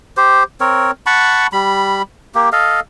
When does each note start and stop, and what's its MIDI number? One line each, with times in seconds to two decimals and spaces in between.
0.17 0.43 67
0.17 0.43 72
0.61 0.91 60
0.61 0.91 70
0.61 0.91 73
1.06 1.47 78
1.06 1.47 81
1.06 1.47 83
1.06 1.47 85
1.53 2.02 55
1.53 2.02 83
2.35 2.49 58
2.35 2.49 67
2.52 2.80 69
2.52 2.80 75
2.52 2.80 77